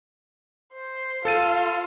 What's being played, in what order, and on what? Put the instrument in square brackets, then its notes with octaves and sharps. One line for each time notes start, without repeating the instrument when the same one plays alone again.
[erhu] C5
[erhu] F4 [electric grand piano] A4 A6 D#7